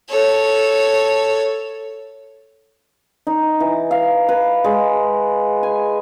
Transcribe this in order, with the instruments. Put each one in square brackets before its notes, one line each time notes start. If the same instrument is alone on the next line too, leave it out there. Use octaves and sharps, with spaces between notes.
[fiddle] A4 C#5
[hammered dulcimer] D#4
E3
F5
B4
G#3
G#5